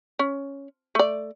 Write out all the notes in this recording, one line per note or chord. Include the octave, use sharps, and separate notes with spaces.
C#4
A3 D5